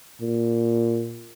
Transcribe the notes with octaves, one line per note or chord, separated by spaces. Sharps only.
A#2